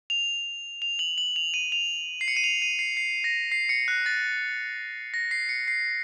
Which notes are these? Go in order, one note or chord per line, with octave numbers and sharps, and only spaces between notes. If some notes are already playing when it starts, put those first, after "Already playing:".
F7
F7
F#7
F#7
F7
D#7
F7
C7
C#7
D#7
F7
D#7
C7
C7
A#6
C7
C#7
F#6
A6
A#6
C7
C#7
C7